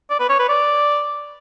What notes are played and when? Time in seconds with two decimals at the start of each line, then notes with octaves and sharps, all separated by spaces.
0.10 D5
0.20 B4
0.30 C#5
0.39 B4
0.49 D5